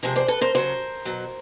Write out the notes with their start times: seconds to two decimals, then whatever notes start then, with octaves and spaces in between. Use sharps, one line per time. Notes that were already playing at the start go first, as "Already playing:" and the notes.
0.03 C3 F3 G#3 A#4 C5
0.16 C5 D5
0.28 A4 B4
0.41 A#4 C5
0.55 C#3 F#3 A#4 C5
1.05 B2 F#3